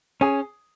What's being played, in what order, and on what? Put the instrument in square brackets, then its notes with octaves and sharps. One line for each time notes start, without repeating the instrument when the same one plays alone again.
[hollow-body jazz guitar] C#4 [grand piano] G#4